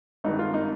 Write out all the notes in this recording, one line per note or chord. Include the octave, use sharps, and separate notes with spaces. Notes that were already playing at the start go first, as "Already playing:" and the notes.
G#1 G2 D#3 D#4
F4
D#4